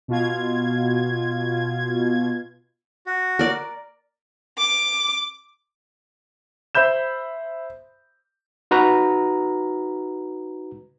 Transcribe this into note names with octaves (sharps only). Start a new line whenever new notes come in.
B2 F4 G#6
F#4
A#4 D5
D6
C5 E5 B5 G6 E7
D#4 F#4 B4 A#5